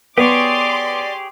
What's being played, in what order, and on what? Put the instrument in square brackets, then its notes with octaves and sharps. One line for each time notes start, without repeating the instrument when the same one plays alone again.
[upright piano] B3 [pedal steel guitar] G4 G#4 C#5 [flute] D5 [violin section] C6 D6